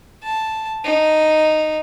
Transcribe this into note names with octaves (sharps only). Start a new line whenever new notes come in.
A5
D#4